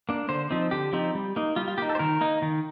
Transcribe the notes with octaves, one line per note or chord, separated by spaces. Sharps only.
A#3 D4
D3 C5
F3 C4 D#4
D3 G4
F3 C4 D#4
G3
A#3 D#4
G3 F4
F4
A#3 D#4 G4
A4
C5
D#3 A#4
A#3 D#4
D#3